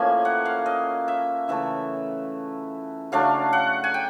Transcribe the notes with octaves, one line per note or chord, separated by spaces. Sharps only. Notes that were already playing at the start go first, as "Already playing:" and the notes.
Already playing: A2 F3 A#3 C#4 G#5
F#5
F5
D#5
E5
C#3 E3 A3 E5
C#3 F#3 A3 D4 F5
F#5
G#5
G5